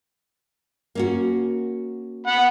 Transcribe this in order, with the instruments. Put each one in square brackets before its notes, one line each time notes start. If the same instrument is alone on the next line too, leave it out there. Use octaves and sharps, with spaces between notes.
[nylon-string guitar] A#3 C#4 F#4
[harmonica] F#5 B5